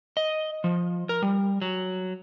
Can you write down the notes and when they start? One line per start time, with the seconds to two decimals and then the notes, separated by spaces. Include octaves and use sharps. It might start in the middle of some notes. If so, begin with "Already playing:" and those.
0.17 D#5
0.64 F3
1.09 A#4
1.22 G3
1.62 F#3